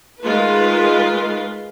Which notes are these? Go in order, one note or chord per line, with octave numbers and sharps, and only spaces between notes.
D#3 G#3 F4 B4